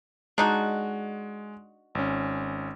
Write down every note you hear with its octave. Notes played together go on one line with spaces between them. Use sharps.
G#3 D4 D#4 F#4
G#1 C#4